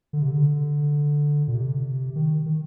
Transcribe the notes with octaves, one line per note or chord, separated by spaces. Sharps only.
D3
C3
D3
A#2
C3
D#3
D#3